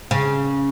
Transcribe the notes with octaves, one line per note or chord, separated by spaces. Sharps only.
C#3